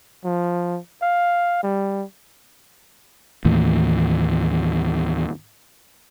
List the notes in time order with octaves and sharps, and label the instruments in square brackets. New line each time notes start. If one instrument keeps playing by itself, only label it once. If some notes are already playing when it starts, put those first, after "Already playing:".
[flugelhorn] F3
F5
G3
[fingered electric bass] D#2 A2 E3